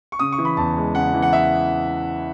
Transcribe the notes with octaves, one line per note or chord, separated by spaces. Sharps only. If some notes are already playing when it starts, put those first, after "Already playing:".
C#6
C#3 D#6
C#6
E3
B5
E2 A5
G#3
C#3 F#5
E3
F#5
E5